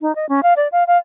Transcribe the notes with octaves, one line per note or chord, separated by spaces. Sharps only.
D#4
D#5
C#4
F5
D5
F5
F5